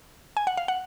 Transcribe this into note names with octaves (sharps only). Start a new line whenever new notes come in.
G#5
F#5
F5
F#5